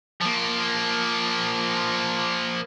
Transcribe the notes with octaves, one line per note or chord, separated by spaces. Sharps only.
F3 A#3